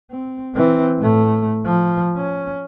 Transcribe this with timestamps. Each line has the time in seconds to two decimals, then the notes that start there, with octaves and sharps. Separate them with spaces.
0.11 C4
0.55 E3 C4
0.99 A2 A3
1.65 F3
2.16 C#4